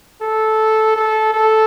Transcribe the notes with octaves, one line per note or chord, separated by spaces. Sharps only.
A4
A4
A4